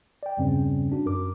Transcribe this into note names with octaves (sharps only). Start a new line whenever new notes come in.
D5 G5
E2 G2 C#3 G3 C4 C#4
D4 F#4
F#2 A#4 D6